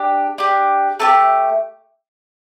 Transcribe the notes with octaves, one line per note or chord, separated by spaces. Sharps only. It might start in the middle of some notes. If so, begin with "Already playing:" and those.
Already playing: D4 G4
D4 G4
A3 D4 G4 A5